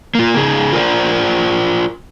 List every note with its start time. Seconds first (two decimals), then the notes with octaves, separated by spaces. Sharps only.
0.15 A#3 F4
0.36 C#3 D#4 G#4
0.73 F4 A#4 C5 D5